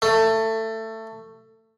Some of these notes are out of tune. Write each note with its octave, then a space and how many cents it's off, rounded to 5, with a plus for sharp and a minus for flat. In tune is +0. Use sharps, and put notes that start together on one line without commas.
A3 +20